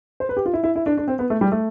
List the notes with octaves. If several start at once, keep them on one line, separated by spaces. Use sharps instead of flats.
C5
B4
G4
F4
E4
E4
E4
D4
D4
C4
B3
A3
G3
A3